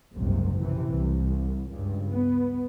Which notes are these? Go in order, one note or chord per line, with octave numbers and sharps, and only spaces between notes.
F#1 C2 G#2 C3
A#1 C3 E3
C2
C#2 G2
B3